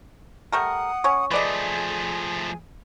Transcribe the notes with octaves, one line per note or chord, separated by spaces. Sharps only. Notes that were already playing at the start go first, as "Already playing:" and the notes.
G3 A3 A#4 F#5 D#6
C#4 C#5
F3 A3 G#4 B4 D5 D#5 G#5